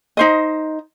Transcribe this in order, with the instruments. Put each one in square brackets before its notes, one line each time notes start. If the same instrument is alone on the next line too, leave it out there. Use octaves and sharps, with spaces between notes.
[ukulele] D#4 C5 D#5